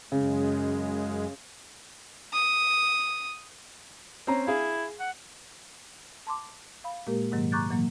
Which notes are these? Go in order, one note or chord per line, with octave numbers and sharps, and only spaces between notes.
F#2 C#3 G#3
D#6
C4 C#4 A#5
E4 G#4 F5
F#5
A5 C6 D6
F5 B5
A#2 G#3 A#3 G4 A#4
G#2 C3 D#3 F#3 A#3
A#5 C#6 D6 F#6 G6 A6
A#2 E3 F#3 A#3